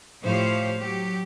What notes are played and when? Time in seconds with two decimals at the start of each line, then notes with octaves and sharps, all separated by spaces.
0.23 A2 F3 G4 C5 C#5 F5
0.79 F#3 G4